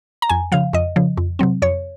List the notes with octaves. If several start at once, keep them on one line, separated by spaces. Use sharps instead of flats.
A#5
F2 G#5
C#3 F3 F5
F2 D#5
C#3 F3
F2
C3 F#3 C4
F2 C#5